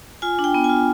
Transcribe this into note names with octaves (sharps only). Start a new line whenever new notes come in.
F4 G#5
D4
G5
B3
G#5
F4